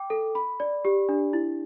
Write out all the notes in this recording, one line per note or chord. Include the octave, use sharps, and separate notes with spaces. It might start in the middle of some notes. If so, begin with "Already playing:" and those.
Already playing: G5 D6
A4
B5
D5
G4
D4
E4